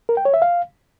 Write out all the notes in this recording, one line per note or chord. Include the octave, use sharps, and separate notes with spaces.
A#4
G5
C#5
E5
F5